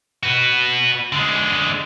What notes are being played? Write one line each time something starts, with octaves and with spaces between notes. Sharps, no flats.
F#4 B4
D3 G#3